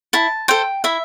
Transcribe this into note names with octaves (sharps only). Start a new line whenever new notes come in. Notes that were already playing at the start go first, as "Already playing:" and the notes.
E4 A5
A4 C5 G5
E4 E5